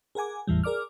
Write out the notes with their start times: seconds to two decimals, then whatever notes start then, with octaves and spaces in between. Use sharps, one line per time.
0.15 G#4 A#4 F#5 G#5 D6
0.47 G#1 E2 A2 E3 G3
0.64 G#4 A#4 D5 D6 F6